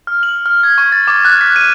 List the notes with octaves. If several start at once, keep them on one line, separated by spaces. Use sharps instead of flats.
F6
F#7
F6
G#6
C#6
A6
D6
F#6
B6
D#7